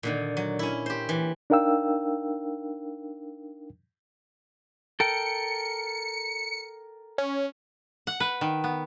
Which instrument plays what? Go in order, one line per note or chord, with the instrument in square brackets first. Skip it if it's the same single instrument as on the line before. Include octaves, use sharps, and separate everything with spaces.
[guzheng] A#2 D3 D#3
F#3
C#4 E4
G4 C5
E3
[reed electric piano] D4 D#4 A#4 F5 G5 E6
[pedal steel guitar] A4 A#4 G5 [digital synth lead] C#7
[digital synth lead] C#4
[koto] F#5
B4
D#3
B3